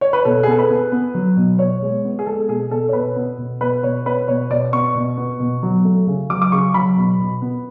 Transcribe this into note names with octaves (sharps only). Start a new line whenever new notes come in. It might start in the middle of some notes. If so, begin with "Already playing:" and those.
C#5
B4
B2 A4
G#4
B3 A4
B4
B3
B3
F#3
B2
B2 C#5
G#3
B3
G#4
G#3 A4
B2 G#4
B2 A4
C#5
B2 B4
B3
B2
B2 B4
B2 C#5
B3 B4
B2 C#5
B2 D5
B3 C#6
B2
B3
B2
F#3
A3
C#3
F#3 D6
D6
C#3 C#6
F#3 B5
B2
B2
B3